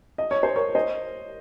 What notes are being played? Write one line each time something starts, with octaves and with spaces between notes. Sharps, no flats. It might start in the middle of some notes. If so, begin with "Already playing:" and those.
D#5
C#5
C5
A#4 C#5
C5 D#5